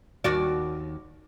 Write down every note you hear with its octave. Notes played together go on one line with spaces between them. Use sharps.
D#2 F#4 D5